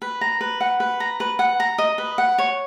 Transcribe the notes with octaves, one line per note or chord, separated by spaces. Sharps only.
B4
A#5
B4
F#5
B4
A#5
B4
F#5
A#5
D#5
B4
F#5
C#5